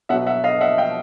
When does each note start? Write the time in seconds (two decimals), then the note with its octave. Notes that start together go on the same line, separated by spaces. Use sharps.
0.09 B2 E5 F#5
0.13 F#3
0.27 E5 F#5
0.44 D#5 F5
0.61 E5 F#5
0.78 F5 G5